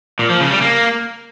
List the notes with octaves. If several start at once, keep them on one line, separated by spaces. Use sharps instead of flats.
A#2
F3
C#3
G3
A#3